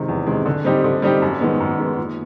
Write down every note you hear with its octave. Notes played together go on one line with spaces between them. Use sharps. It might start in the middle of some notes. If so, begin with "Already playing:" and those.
Already playing: C3 D#3 G#3
E2
C3 D#3 G#3
D3
G3 C4 D#4 G4
D3
G3 C4 D#4 G4
F#2
D#3 G#3 B3
F#2
D#3 G#3 B3
A#2